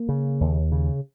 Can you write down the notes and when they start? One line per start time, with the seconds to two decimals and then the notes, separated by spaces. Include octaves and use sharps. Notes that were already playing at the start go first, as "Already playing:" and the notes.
Already playing: A#3
0.09 C#3
0.41 D#2
0.72 C#3